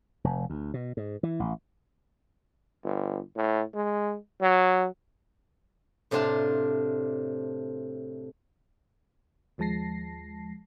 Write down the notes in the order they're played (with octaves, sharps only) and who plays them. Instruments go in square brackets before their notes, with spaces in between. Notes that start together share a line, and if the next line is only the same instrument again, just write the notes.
[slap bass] F1
D2
B2
G#2
E3
A1
[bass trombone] G1
A2
G#3
F#3
[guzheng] A2 C3 D4 F4 A5 A#5
[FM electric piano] D#2 F3 G#3 A5 A#6 C7